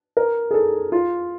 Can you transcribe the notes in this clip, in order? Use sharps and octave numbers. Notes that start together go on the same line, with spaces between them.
A#4
G#4
A4
F4